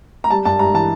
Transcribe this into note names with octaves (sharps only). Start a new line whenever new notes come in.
A#5
G3 A5
G2 A5
G2 A#5
E3 A5